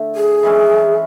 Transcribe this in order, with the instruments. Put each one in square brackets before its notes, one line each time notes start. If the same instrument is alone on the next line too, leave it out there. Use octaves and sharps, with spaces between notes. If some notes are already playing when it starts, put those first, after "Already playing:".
Already playing: [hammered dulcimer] D3 A3 E4
[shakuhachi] G#4
[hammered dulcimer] E3 G#3 C#4